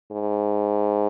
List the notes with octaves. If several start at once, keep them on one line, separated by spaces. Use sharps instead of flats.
G#2